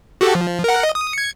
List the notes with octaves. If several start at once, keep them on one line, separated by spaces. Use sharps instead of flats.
F#4 G4 A4
F3
A#4 F#5
D#5
D#6
G#6 C#7